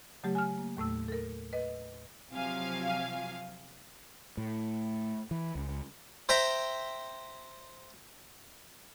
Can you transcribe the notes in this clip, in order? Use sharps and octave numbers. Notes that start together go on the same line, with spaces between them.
C#3 F#3 A3 G4
G#5 F6
A#3
D#2 A2 A3 E6
A4 A#4
B4 D#5
C3 F3 F#3 F5 G#5
A2
E3
C#2
C5 E5 G5 A#5